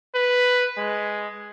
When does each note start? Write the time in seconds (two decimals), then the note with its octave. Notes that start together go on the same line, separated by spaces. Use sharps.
0.15 B4
0.77 G#3